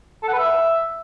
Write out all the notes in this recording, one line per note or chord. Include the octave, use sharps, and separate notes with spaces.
A4
F#5
B4
E5